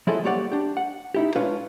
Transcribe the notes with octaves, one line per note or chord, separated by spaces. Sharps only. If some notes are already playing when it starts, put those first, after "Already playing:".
F#3 E4 F4 G#4 A4 D#5
G3 A#3 G4 C#5 D5 F#5
D4 G4
F#5
D#4 E4 G4
G#3 D4 F4 B4 C#5 F5